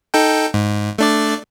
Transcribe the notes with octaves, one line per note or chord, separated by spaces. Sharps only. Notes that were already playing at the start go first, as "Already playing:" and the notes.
D#4 A4 G5
G#2
A3 D4 D5